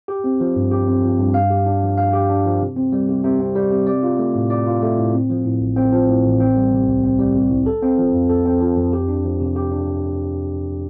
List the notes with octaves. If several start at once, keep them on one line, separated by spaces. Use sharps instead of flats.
G4
C4
F3
G2
G4
C4
F3
G2
F5
G4
D4
F3
F5
G4
D4
F3
C3
C4
G3
C3
C3
C4
G3
C3
D5
F4
A3
A2
D5
F4
A3
A2
C4
F3
A2
A1
C4
F3
A2
A1
C4
G3
C3
C2
C4
G3
C3
C2
A4
C4
F3
F2
A4
C4
F3
F2
G4
D4
F3
C3
G4
D4